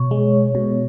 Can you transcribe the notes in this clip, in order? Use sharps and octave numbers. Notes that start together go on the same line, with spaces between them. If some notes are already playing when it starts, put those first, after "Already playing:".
Already playing: B2 C#5
G#3
B2